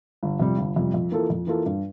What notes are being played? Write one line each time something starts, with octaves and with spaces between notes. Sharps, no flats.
G1
F2 C3 G3
G1
F2 C3 G3
F2
E3 A#3 F4 A4
F2
E3 A#3 F4 A4
G2